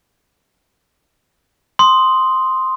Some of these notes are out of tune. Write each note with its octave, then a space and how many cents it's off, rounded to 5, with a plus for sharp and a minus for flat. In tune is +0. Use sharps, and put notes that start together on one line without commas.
C6 +0 D#6 +0